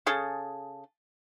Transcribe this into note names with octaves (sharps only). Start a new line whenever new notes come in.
C#3 G#4 A4